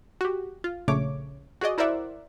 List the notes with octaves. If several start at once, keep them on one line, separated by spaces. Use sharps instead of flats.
F#4 G4
F4
A#1 C#3 A3 C#5 D6
F#4 G#4 D5 D#5
E4 A#4 C5 D5 E5 F#5